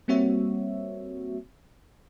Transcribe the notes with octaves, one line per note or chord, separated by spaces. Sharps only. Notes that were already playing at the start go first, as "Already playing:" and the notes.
G3 A#3 C4 F#4 C#5 E5